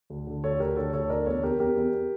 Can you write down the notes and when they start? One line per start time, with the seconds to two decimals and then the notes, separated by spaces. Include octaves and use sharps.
0.10 D2
0.27 D3
0.44 D2 A4 C#5
0.60 D2 G4 A#4
0.76 D3 A4 C#5
0.93 D2 A4 C#5
1.10 D3 A#4 D5
1.27 E2 A4 C#5
1.43 E2 G4 A#4
1.59 E2 G4 A#4
1.77 E2